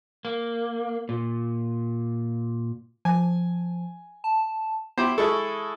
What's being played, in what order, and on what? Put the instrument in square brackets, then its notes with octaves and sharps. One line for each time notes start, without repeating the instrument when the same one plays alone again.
[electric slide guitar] A#3
A#2
[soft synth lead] F3 [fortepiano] G#5
[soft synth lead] A5
[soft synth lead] B3 [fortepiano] E4 G4 C5
[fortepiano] G#3 E4 A4 [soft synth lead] C#6